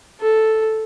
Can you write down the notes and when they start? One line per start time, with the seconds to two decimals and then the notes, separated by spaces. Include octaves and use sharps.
0.21 A4